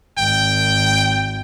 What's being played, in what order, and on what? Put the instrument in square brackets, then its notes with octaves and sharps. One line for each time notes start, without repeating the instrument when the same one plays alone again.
[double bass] G#1 [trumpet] G5